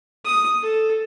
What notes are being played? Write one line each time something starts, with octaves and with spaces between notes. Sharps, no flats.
D#6
A4